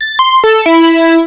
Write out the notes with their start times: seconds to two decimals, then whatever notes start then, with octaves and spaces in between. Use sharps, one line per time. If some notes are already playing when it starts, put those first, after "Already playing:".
0.01 A6
0.19 C6
0.44 A4
0.66 E4